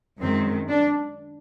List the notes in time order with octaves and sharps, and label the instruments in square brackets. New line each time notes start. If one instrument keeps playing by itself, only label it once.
[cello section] F#2 D#3 G#3 C4
D4